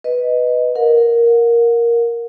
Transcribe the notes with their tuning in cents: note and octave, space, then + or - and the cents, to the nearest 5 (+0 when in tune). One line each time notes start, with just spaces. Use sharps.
B4 +0 D#5 +0
A#4 +5 F#5 -45